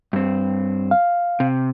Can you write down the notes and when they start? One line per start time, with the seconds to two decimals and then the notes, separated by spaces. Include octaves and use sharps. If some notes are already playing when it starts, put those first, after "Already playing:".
0.13 G2 C4
0.91 F5
1.40 C3